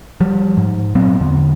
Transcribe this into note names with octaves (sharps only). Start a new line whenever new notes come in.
F3 G3
G#2
A#2 F#3 B3 C4
E2 D3